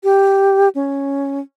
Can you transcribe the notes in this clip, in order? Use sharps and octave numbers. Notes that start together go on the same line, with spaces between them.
G4
C#4